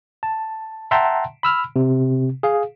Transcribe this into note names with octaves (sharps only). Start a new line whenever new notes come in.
A5
E5 F#5 G5 A5 A#5 C6
B5 E6 F6
C3
G#4 F5